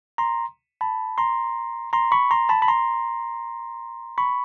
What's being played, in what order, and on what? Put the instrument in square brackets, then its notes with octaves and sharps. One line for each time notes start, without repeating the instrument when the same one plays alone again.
[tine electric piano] A#5 C6
A5 B5
A#5 C6
A#5 C6
B5 C#6
A#5 C6
A5 B5
B5
A#5 C6
B5 C#6